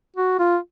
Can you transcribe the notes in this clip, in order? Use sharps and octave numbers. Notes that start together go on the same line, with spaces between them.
F#4
F4